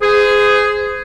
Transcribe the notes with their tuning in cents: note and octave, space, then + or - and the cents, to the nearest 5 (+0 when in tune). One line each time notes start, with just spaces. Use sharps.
G#4 +0 C5 -35